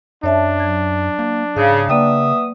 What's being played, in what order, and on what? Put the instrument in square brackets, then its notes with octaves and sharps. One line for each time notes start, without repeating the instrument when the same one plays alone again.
[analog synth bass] F#2 [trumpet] D4 [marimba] C#5 E5 A5
[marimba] F#3 G#6
[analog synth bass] A#3
[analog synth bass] G#2 [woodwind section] C#3 [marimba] F5
[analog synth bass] C#3 [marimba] A#3 D5 G5 [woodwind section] B3 E5 D#6